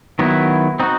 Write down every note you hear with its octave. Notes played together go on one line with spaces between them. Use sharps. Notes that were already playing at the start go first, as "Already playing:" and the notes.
D#3 F#3 B3 E4
C4 D#4 F#4